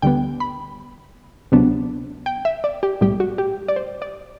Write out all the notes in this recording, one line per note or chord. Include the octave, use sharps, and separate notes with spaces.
D2 D3 G3 B3 G5
B5
D2 C3 F#3 B3 D4
G5
E5
D5
G4
B1 A2 G3 G4
F#4
G4
D5
C5
D5